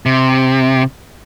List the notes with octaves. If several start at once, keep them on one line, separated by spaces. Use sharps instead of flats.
C3